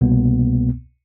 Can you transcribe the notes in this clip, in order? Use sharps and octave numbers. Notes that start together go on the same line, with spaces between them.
C2 B2 A#3 B3